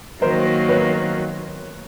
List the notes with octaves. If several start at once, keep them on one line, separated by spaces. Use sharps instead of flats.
D#3 F#3 A#3 A#4 C5
B4 C#5